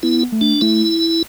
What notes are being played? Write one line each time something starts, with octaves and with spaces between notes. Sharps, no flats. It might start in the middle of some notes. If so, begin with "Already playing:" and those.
B3 E4
A3
D4
A3 E4